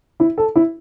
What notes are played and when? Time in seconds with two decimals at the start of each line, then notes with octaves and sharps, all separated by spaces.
0.20 E4
0.38 A4
0.56 E4